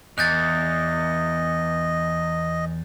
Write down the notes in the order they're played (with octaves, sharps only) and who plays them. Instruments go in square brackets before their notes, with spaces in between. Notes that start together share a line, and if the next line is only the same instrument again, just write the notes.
[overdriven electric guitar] E2 [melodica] D#5 [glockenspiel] F#6 G6 A6